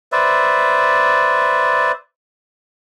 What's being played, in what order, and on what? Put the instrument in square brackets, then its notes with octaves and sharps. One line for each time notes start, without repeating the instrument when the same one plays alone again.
[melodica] B4 C5 D5 E5